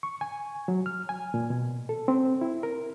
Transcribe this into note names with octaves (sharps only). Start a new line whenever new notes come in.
C#6
G#5
F#3
F6
G#5
A#2
B2
A4
C4
E4
A#4